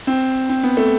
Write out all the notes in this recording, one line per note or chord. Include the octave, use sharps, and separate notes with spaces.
C4
C4
B3
A3